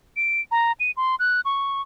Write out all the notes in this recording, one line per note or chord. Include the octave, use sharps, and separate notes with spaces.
D7
A#5
D#7
C6
F#6
C#6